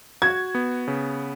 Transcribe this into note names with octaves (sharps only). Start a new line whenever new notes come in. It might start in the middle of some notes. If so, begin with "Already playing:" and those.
F#4 G#6
B3
C#3